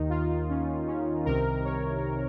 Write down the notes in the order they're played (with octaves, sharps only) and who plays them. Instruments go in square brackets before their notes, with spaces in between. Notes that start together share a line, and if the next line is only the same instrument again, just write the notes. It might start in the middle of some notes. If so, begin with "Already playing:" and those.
Already playing: [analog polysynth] D#2 D#3 D#4
F4
C#4
C#4
C2 C3 D#3 A#4
C#5